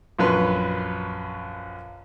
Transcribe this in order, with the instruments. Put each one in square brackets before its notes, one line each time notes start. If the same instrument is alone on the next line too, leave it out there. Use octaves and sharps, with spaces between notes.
[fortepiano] A#1 F#2 B4 C6